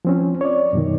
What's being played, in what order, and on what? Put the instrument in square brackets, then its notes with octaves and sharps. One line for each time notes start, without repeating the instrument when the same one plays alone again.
[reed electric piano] F3 C4 C#4
C#5 D5
F#2 B2 D#3